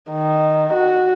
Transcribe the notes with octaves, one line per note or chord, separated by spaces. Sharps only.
D#3
F#4